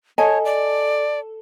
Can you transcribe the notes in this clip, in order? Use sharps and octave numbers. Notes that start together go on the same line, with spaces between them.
A4 C#5 D#5 G#5
D5